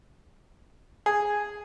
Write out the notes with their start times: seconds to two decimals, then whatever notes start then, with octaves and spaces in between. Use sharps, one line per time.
1.06 G#4